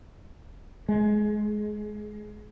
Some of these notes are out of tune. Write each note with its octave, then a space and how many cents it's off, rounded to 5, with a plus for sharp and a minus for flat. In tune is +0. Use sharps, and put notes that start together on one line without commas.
G#3 +20